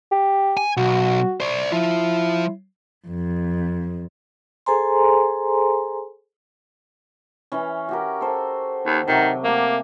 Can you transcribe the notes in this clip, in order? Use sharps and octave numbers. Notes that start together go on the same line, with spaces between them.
G4
G#5
B1 F#4
C5 D5
F3 E4 F4
F2
G#4 A4 C5 G#5 A#5 C6
E3 C#4
F#4 G4 A#4
A4 C5
D#2
C3 D#3 F#3
A3 A#3 G4